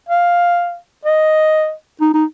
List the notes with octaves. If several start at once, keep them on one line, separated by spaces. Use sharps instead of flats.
F5
D#5
D#4
D#4